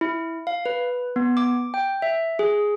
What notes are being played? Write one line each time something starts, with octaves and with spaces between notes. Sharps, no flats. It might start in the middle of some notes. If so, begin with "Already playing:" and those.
E4
F5
B4
B3
D6
G5
E5
G#4